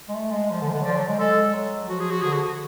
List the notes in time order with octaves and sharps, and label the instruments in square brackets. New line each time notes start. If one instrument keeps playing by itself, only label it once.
[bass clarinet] G#3
A3
G#3
F3
D3
F3
D3
F#3
[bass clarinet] F3 [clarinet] D5
[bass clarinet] F#3
G#3
[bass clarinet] G#3 [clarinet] A4
[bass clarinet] F#3
[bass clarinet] F3 [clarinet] F#4
[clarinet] G#4
F#4
[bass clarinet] D3 [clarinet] G#4
[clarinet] F#4